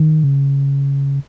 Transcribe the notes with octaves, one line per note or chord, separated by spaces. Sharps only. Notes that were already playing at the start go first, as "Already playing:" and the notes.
Already playing: D#3
C#3